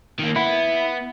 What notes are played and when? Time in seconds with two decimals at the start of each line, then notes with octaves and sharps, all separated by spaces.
0.19 D#3 A#3
0.36 B3 E4